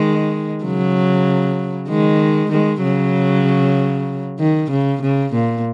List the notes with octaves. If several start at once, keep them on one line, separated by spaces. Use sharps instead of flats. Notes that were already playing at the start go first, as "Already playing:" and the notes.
Already playing: D#3 G#3
C#3 F#3
D#3 G#3
D#3 G#3
C#3 F#3
D#3
C#3
C#3
A#2